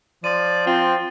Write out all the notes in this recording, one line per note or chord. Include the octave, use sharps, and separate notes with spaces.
F3 D5 A6 D#7
C4 F4